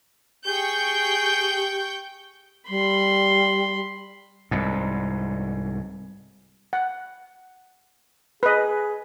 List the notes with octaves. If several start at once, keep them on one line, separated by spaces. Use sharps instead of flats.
G4 G#4 G5 C#6 G6
G3 B5 C6
C2 G#2
F#5
G#4 B4 D#5